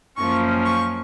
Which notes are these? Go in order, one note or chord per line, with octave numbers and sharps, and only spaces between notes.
F#2 F3 A#3 C#4 C#6
C#6